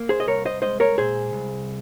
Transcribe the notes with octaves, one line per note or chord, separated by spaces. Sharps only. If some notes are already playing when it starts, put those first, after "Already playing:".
Already playing: A#3
G#4 C5
D#5
C2 A#4 C#5
C5 D#5
G#3 C5 D#5
A#4 C#5
A#2 G#4 C5
C2